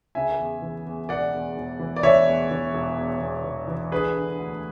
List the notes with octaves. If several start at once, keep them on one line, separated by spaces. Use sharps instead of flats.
C#3 E5 G#5
E2
E3
E2
E1 D5 F#5
E2
E1
E3
D5
E3 C#5 E5
E2
E3
E1
E2
E2
E3
E3
D3 G#4 B4
D3
D2